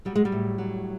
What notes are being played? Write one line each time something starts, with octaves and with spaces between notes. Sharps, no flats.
F#3 G3
G#3
G3
A2
F#3